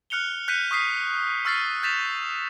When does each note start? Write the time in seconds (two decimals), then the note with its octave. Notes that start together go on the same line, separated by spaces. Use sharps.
0.10 F6 F#6 C#7 F7 G7
0.48 F#6 G6 B6 C#7 D#7
0.71 C#6 D#6 B6 C7 D#7
1.45 C#6 E6 F6 A6 B6 C7
1.83 F6 G6 A6 B6 E7 F7